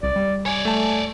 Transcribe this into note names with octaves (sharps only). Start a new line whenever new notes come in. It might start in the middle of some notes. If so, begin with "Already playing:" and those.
C2 D5
G3
C#5 D5 G#5
A3 A5